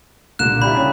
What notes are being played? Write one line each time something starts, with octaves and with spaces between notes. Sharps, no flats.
C2 A#2 D3 A#3 F#6 E7
G3 E4 G4 D5 B5 G6
C#2 G#4 C#5